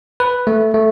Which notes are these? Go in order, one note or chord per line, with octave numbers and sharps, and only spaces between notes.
B4
A3
A3